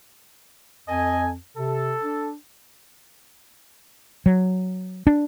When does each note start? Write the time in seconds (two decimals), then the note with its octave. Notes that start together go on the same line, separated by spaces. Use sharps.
0.88 F2 A4 D#5 G#5
1.57 C3 A4
2.03 D4
4.26 F#3
5.07 D4